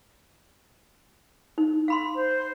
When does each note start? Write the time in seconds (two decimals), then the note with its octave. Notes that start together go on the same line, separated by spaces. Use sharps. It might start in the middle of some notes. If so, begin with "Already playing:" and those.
1.58 D#4
1.88 F5 B5 C6
2.14 C5